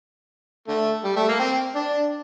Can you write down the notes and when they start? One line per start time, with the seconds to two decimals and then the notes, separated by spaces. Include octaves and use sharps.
0.68 D3 A3
1.05 G3
1.16 A3
1.29 A#3
1.40 C4
1.75 D4